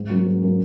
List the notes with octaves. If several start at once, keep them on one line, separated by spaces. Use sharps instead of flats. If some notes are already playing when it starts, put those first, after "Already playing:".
Already playing: G#2
F#3 A#3 C#4
G#2
F#3 A#3 C#4